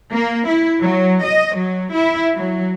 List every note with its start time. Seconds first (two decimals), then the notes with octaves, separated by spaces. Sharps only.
0.13 A#3
0.47 E4
0.82 F#3
1.25 D#5
1.57 F#3
1.94 E4
2.36 F#3